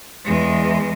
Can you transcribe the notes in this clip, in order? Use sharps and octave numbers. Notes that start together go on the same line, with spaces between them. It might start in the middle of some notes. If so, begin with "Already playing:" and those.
E2 G#3